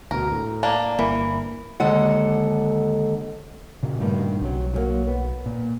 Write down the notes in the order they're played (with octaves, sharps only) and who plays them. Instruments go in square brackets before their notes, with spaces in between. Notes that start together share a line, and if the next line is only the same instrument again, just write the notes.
[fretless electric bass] D2 B2 [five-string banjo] A#4
[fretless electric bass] A2
[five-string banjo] A#3 D4
[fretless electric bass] G1 A#3 [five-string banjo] E3
[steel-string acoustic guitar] D#2 D3 G#3 A4 F#5
[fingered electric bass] A#2 C#3
[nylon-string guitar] D2 G2 D#3
[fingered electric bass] B1 [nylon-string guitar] C3 F#3
[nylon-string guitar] F#3 G3 A#3
B3
[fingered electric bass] A#2